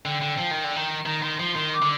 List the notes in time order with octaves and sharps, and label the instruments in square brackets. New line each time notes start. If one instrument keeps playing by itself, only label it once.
[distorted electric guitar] D3 [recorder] G5
[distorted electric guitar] D3
F3
D#3
D3
D#3
[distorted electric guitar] D#3 [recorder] A#5
[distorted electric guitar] D#3 [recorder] C6
[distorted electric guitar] F3 [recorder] C6
[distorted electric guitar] D#3 [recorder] C6
[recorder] D6
[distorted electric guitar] D3